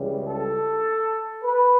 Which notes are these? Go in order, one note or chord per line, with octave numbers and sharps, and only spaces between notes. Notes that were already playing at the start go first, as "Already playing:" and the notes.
Already playing: C#2 C#3 E3 G3
A4
B4